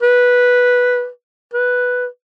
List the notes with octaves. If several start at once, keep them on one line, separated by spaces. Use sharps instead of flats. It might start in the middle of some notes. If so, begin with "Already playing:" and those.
B4
B4